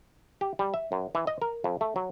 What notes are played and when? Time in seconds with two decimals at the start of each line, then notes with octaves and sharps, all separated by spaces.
0.41 G4
0.59 G3
0.74 E5
0.92 F#2
1.15 E3
1.27 D#5
1.42 A#4
1.64 F2
1.81 A3
1.96 F#3